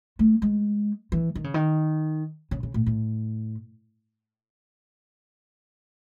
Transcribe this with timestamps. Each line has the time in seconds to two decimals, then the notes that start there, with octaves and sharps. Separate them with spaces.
0.19 A3
0.42 G#3
1.12 E3
1.35 D#3
1.44 C#3
1.54 D#3
2.51 C#3
2.63 C#3
2.74 A2
2.86 A2